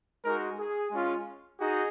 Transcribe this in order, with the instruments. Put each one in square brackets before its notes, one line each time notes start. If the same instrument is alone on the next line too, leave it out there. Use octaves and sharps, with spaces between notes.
[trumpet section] G#3 D#4 F#4 A#4
G#4
G#3 C#4 F4
D#4 F#4 G#4